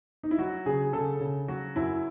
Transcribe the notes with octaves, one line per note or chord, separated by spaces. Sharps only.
D#4
E4
F#3 F#4
C#3 G#4
C#3 A4
C#3
F#3 F#4
F#2 E4